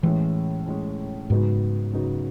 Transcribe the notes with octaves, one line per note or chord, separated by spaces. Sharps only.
A2 E3 G#3 C#4
A2 G#3 C#4
G#2 C#3 F#3 B3 D#4 F#4
C#3 F#3 B3 D#4 F#4